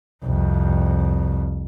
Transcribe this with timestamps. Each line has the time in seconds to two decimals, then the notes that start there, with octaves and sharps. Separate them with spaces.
0.24 C2 F2